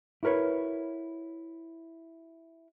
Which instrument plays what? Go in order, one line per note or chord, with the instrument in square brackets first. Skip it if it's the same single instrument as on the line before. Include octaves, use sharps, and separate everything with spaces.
[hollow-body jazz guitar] E4 F#4 A#4 B4 C#5